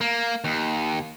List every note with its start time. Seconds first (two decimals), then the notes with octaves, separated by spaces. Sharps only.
0.01 A#3
0.44 D#2